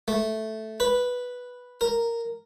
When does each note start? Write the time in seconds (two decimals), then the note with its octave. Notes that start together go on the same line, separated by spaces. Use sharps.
0.08 A3
0.80 B4
1.81 A#4